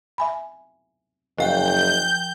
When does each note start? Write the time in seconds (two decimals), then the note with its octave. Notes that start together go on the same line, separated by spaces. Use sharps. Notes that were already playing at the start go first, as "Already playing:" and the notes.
0.18 E5 G#5 B5
1.38 F#1 F3 D#5 F5 G5 F#6 G6